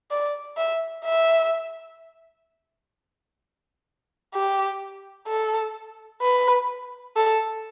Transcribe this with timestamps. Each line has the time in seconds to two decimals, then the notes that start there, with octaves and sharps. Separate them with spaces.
0.11 D5
0.57 E5
1.05 E5
4.34 G4
5.28 A4
6.22 B4
7.16 A4